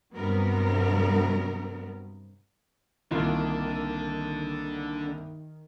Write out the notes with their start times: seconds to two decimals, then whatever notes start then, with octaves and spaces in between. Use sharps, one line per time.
0.15 G2 C3 F#3 G3 B3 A#4
3.11 C2 D3 D#3 A#3 D4 E4 F4 C6